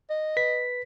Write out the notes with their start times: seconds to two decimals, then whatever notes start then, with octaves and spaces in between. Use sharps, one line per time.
0.10 D#5
0.37 B4 B6